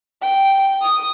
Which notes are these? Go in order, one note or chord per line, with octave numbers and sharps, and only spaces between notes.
G5
D#6